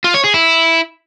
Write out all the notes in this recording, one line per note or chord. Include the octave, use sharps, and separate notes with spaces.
F4
C#5
G#4
E4